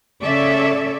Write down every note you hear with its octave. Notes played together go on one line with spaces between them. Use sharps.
C#3 C#4 A4 C#5 D5 E5